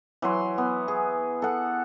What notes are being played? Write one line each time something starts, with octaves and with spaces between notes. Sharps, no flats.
E3 F#3 C6
B3
G#4
A4 F#5